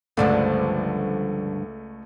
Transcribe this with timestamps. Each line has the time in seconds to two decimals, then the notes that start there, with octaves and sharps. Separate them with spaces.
0.17 C#2 G2 D3 F3 A3 D5